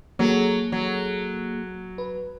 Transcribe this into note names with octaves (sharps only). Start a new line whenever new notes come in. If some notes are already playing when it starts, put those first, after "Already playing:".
F#3 A#3 G#4 A4
F#3
B4